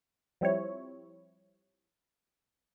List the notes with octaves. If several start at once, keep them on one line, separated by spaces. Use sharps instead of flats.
F3 G3 C4 E4 C#5